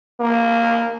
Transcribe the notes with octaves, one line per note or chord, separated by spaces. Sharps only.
A#3